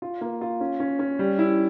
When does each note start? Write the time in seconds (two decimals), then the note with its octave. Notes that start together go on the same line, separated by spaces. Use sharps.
0.02 F4
0.21 A#3
0.41 F4
0.61 C#4
0.80 C#4
0.99 C#4
1.19 G3
1.39 E4